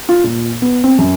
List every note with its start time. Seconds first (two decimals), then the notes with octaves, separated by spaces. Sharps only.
0.09 F4
0.24 A#2
0.62 B3
0.84 C4
0.98 F#2